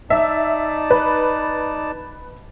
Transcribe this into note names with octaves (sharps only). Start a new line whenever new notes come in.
D#4 D5 E5 A5
B4